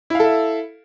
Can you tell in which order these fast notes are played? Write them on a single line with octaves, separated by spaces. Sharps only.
E4 F5 A4 E5